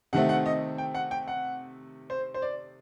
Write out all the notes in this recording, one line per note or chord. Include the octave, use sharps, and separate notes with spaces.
C3 D#3 A3 C4 F#5
F#5
D#5
G5
F#5
G5
F#5
C5
C5
D5